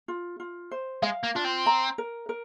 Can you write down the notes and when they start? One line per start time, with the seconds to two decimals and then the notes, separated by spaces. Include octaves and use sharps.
0.08 F4
0.40 F4
0.71 C5
1.02 G#3 F5
1.23 A#3
1.35 D4 F4
1.45 C4
1.66 A#5
1.98 A#4
2.29 A#4